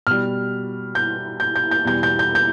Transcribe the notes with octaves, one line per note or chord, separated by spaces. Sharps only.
B2 G3 F6
G6
G6
G6
G6
E2 B2 G3 G6
G6
G6
G6